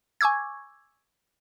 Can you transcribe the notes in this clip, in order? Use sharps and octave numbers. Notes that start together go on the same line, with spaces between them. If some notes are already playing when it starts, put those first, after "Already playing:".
G#5 C#6 D6 E6 G#6